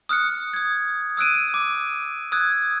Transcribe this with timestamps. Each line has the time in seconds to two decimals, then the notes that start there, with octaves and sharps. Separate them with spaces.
0.09 D#6 F6 F#6 C#7
0.53 D#6 G#6
1.17 D#6 E6 F#6 D7 D#7
1.54 D6
2.32 D#6 E6 F#6 G#6